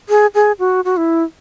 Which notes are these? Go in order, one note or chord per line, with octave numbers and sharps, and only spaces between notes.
G#4
G#4
F#4
F#4
E4